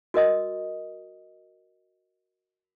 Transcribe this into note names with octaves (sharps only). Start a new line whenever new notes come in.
F#4 A#4 D#5 D#6